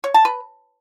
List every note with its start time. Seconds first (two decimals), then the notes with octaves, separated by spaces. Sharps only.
0.04 C#5
0.14 A5
0.25 B4